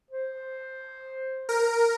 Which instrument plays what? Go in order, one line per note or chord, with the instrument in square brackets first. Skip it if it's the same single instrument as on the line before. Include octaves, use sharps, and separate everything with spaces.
[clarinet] C5
[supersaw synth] A#4